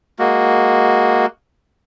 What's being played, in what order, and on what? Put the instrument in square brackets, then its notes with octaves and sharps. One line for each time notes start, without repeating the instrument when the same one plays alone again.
[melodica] G#3 A#3 F#4